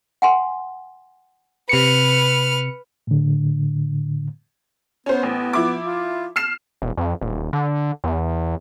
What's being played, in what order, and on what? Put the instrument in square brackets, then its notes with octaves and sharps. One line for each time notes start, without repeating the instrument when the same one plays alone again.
[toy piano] F#5 G#5 C6
[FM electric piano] C3 C#7 [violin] B4 F6
[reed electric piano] A2 D3
[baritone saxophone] B3 [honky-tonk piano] C#4 C5
[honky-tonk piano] A1
F3 E4 D6
[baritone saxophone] F4
[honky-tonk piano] F6 C7 E7
[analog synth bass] E1
F2
D#1
D3
E2